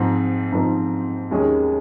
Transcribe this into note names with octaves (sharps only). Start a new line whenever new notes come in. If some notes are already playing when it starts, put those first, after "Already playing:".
Already playing: G#2 F3 C4 D#4
G#2 F3 C4 D#4
D#2 D#3 G#3 C#4 G#4